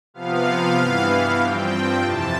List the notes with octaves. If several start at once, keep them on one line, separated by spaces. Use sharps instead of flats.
C3 F3 B3 F5
G2 E3 B3
G2 F3 C4 G5
F2 C3 E3 A5